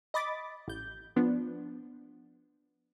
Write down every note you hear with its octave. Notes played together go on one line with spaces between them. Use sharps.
D#5 B5 D6 A6
A1 G6
F3 B3 D4